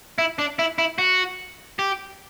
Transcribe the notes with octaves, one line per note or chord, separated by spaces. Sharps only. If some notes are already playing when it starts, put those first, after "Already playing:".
E4
D4
E4
E4
F#4
G4